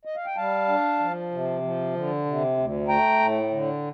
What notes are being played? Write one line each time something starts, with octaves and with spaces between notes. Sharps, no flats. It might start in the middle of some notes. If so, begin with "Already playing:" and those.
D#5
F5
G5
G3 F5 A5
D4
F3
C3
F3
D3
C3
D2
A3 G5 A#5
A2
D3